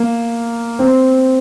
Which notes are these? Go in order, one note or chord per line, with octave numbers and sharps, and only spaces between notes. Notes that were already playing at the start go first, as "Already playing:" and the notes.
Already playing: A#3
C4